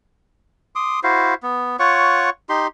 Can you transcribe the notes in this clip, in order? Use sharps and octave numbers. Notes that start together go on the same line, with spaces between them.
C6 D6 D#6
E4 F#4 C5 F5
B3
F4 C#5 F#5 C#6
D#4 G4 C6